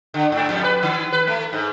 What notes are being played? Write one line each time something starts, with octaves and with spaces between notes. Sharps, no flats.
D3
G#2
F2
B4
D#3
B4
A3
G#2